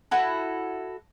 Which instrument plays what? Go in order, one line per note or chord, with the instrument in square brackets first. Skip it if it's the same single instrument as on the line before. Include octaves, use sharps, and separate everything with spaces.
[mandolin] E4 F#4 A4